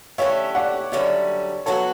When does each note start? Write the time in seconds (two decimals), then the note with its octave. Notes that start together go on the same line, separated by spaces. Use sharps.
0.18 D3 A3 C#4 E4 G4 C#5 E5
0.55 D5 F#5
0.92 F#2 D3 G3 C#4 C#5 E5
1.66 F#3 B3 F#4 A4 C#5